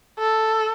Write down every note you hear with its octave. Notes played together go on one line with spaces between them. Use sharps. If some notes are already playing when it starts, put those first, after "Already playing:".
A4